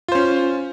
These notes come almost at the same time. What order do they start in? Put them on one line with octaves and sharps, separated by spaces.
F4 C5 C#4